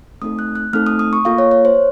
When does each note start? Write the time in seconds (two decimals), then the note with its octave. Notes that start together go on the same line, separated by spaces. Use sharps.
0.22 A3 C4 D#4 A4 D#6
0.39 F#6
0.55 F#6
0.73 A3 C4 D#4 A4 F6
0.87 D#6
0.99 D#6
1.13 C#6
1.25 A#3 F4 A4 F5
1.38 C#5
1.51 C#5
1.65 C5